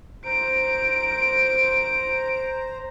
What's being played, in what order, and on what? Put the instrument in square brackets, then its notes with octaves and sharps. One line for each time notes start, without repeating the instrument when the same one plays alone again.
[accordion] C5 A#5 [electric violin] D7